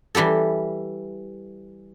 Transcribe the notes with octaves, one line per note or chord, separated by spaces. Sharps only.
E3 G3 G4 A4